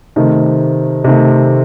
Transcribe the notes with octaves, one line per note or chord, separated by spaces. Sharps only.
C3 D#3 A3
C3 D#3 A3